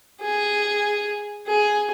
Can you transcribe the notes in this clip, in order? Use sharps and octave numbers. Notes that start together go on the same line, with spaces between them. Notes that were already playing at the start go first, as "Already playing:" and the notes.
G#4
G#4